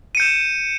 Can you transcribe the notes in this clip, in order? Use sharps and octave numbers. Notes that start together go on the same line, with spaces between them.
G6 C#7 D#7 E7